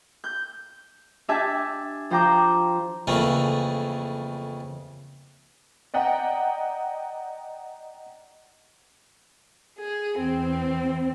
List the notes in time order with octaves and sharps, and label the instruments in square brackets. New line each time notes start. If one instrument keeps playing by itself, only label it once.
[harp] G6
D4 G4 E5 G#5 A5
F3 C5 G5 A#5 D6 G6
[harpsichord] F2 C#3 E3 A3 A#3
[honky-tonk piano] D5 D#5 F#5 G5 A#5
[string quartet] G#4
E2 C4